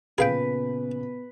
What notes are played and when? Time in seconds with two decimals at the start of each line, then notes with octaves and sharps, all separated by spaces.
0.18 A#2 C#3 B3 G#4 B4 F5 G5